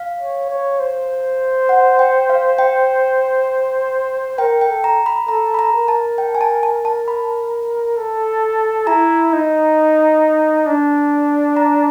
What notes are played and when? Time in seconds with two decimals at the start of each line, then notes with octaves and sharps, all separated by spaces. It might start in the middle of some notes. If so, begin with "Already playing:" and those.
Already playing: F5
0.20 C#5
0.50 C#5
0.80 C5
1.69 F#5
1.99 G5
2.30 F5
2.58 G5
4.38 A#4 G5
4.61 G5
4.69 A4
4.84 A#5
5.06 B5
5.28 A4 A#5
5.54 B5
5.59 A#5
5.73 A#4
5.88 A5
6.18 G5
6.35 G#5
6.41 A5
6.63 A5
6.85 A5
7.08 B5
7.97 A4
8.87 E4 A#5
9.33 D#4
10.67 D4
11.57 A#5